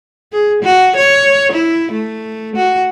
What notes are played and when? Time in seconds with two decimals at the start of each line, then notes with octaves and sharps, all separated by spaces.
0.32 G#4
0.63 F#4
0.96 C#5
1.53 E4
1.92 A3
2.56 F#4